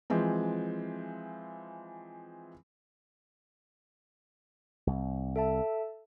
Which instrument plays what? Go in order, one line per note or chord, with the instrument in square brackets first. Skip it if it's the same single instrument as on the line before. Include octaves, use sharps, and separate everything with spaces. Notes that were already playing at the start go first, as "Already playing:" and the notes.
[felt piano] E3 F3 G#3 C4
[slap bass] C2
[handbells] A4 E5 A5